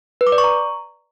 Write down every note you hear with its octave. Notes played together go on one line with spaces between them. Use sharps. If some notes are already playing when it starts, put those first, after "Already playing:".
B4
D6
D5
C#6
A#5